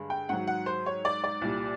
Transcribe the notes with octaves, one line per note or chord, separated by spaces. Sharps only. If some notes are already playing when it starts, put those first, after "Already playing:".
Already playing: G2 D3 G#3
G5
G#2 D#3 F#3 F#5
F#5
C5
C#5
D5
D5
C2 A#2 G3